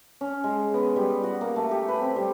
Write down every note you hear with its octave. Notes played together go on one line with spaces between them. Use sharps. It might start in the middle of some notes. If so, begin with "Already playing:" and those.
C#4
G#3
B3
G3
F#4
A#3
A3
G4
B4
C4
G3